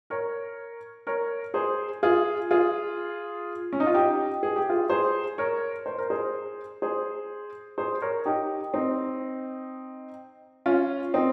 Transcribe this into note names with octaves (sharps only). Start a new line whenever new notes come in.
A#4 C#5
A#4 C#5
G#4 C5
F4 G#4
F4 G#4
C#4
D#4
F4
D#4 G4
G#4
G4
F4 G#4
G#4 C5
A#4 C#5
C5
A#4
G#4 C5
G#4 C5
G#4 C5
A#4 C#5
D#4 G4
C4 D#4
C#4 F4
C4 D#4